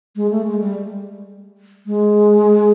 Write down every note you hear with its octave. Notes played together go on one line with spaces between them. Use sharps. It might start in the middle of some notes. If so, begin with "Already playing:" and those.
G#3
A3
G#3
G3
G#3